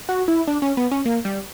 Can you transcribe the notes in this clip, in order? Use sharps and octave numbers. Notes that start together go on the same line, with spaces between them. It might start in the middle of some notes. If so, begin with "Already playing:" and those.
F#4
E4
D4
C#4
B3
C#4
A#3
G3